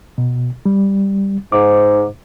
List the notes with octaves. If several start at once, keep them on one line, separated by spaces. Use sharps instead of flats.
B2
G3
G#2 D6